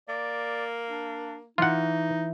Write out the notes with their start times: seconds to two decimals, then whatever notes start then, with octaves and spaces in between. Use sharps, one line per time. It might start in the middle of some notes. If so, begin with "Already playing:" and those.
0.09 A#3 D5
0.89 D4
1.58 E3 D#4 F4 F#5